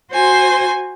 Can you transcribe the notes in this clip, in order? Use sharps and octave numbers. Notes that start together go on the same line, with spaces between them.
F#4 C5 G#5 C6